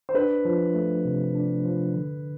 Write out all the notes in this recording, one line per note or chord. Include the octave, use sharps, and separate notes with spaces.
C5
D4 B4
F3
A3
C3
D4
F3
D3